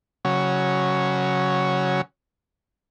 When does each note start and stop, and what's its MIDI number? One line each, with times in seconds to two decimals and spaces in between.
0.25 2.01 49
0.25 2.01 54